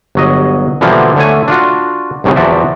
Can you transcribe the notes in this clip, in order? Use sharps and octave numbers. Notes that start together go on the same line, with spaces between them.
G1 F#3 D#5
B2 D3 E3 F3 G3 A#3
D3 A3 C#5 G#5
D4 F4 F#4
C2 G2 C#3 B3 C4
E2 F3 F#4 D5 E5